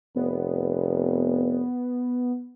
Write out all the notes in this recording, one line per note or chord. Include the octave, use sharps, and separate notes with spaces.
F1 B3